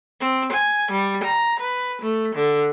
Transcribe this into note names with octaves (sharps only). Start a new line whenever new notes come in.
C4
G#5
G3
A#5
B4
A3
D3